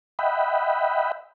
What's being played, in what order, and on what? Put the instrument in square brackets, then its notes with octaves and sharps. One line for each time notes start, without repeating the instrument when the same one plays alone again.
[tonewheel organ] D#5 E5 F#5 G5 B5